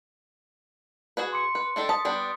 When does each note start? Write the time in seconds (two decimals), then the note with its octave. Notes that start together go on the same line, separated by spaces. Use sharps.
1.17 F#4 G#4 B4
1.32 C6 D6 C#7
1.55 B4
1.76 D#3 D4 A4
1.89 A5 D#6 B6
2.05 G3 B3 D4